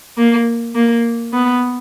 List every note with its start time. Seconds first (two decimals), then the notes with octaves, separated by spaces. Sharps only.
0.18 A#3
0.75 A#3
1.33 B3